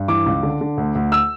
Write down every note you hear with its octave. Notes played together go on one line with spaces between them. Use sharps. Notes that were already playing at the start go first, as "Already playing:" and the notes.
Already playing: G2
E3 D6
C#2
D3
D3
D2
D2
E6